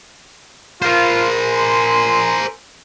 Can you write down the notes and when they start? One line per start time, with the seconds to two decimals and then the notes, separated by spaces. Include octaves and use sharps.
0.82 F4 A#4 C5
1.37 G#5 A#5 C6